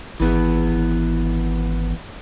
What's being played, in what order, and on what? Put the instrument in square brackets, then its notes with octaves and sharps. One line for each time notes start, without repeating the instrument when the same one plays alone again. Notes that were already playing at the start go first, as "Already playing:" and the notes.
[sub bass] G#1 [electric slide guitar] E3 B3